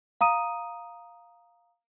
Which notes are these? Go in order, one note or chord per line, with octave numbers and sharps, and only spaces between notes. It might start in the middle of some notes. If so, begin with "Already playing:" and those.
F5 A#5 D#6 D#7